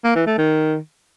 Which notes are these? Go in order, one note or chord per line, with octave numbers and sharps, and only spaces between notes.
A#3
E3
A3
D#3